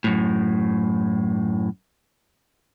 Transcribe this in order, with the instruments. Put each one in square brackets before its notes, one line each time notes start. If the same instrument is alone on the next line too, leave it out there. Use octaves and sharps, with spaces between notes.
[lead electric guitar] F#2 A2